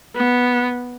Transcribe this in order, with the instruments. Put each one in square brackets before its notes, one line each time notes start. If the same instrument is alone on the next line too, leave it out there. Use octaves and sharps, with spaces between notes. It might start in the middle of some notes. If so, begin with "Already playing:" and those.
[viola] B3